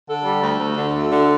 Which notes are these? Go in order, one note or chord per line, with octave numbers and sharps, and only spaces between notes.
D3 A4
G3
D2
D2
D3
D2
D3